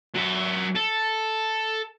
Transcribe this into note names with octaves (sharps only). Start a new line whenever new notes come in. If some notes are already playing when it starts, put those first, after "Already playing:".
F#3 E5
A4